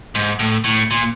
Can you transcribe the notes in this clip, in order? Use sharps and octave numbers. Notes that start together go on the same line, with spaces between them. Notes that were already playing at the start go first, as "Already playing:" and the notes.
G#2
A2
A2
A#2